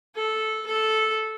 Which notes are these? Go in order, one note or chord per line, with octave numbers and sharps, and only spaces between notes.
A4
A4